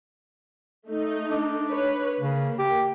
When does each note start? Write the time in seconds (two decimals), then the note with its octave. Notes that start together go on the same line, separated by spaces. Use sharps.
0.87 A3 D#4
1.31 D4
1.69 B4 C#5
2.20 C#3 A#3
2.59 G4